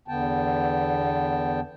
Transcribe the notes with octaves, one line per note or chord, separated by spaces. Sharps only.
E2 D3 B3 G5 A5